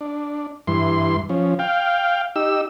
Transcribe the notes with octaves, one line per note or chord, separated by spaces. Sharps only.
D4
G2 E3 C6
F3 C#4
F5 G5
D#4 G4 E6